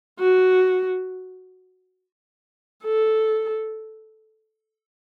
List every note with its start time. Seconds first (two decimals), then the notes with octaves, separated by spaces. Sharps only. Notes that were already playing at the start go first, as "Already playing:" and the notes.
0.19 F#4
2.84 A4